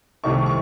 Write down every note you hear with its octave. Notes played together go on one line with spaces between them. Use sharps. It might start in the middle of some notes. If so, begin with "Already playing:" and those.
C2 C3 D#3 A3 C#6
C#6